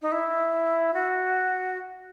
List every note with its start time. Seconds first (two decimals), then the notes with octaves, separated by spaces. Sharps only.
0.02 D#4
0.12 E4
0.94 F#4